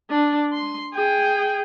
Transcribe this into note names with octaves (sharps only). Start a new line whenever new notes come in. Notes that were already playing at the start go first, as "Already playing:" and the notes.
D4
C6
G#4 G5